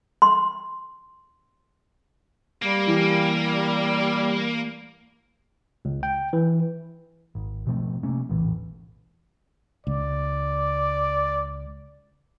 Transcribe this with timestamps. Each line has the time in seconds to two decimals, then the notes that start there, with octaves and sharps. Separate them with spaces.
0.22 C6
2.62 G3 A#3
2.87 E3
5.85 C#2
6.03 G5
6.33 E3
7.35 G#1
7.67 B2 F3 A3 C4
8.03 C3 A3 A#3 C#4
8.29 E1 A#1 A2 E3
9.87 C#2 D5